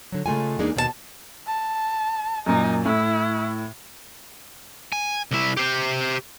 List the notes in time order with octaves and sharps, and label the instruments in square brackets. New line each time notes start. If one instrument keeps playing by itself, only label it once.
[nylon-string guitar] D3 F#3
C#3 G#3 A3 F4 G#5
E2 G#3 A#3 D4 D#4 G#4
D#2 B2 B3 A#4 A5
[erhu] A5
[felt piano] F#2 A#2 [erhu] D#4
[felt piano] A2 [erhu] E4
[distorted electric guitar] G#5
C2 E4
G4 C5